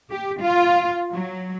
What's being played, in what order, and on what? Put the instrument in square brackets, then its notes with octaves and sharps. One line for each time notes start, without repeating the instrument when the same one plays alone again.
[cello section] G4
F4
F#3